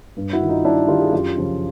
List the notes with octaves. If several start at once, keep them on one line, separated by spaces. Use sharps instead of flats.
G2
E4 F#4
D#3
D#4 F4
G2 D4 E4
D#3 F4 G4
G#4
F#2 F4 G4
C#3 F3